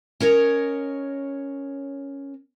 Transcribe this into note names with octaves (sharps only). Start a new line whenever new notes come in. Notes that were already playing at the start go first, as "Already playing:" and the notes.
C#4 A#4 C#5 D#5